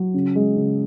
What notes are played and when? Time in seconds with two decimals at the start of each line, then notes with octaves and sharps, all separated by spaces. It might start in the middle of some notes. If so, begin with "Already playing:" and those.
Already playing: F#3
0.14 C#3
0.35 G#3
0.56 C#3